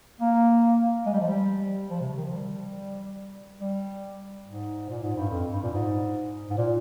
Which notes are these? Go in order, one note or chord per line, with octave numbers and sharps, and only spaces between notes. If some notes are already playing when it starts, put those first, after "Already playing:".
A#3
G#3
G3
F3
G3
F3
C3
C#3
D#3
F3
G3
G3
G#2
A#2
G#2
G2
F2
G2
A#2
G#2
G#2
A#2